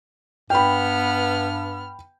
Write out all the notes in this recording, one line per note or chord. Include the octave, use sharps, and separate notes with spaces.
G2 B3 G5 B5 F6